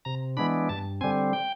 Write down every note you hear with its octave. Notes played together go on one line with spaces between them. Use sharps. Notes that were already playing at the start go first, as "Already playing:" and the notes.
C3 A#5
E3 G#3 B3 D4 B5
G2 A5
D3 G3 C4 G#5
G5